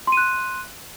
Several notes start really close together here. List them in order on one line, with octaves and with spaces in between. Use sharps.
C6 D#7 F#6